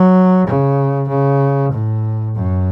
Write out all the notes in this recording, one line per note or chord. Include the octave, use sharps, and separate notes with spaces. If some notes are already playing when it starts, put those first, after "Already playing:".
Already playing: F#3
C#3
C#3
A2
F#2